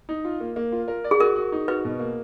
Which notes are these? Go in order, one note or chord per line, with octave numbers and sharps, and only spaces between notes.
D#4
F4
A#3
A#3
F4
A#4
D5
G#4
F#4 A#4
F#4
D#4
F#4 B4
B2
A#3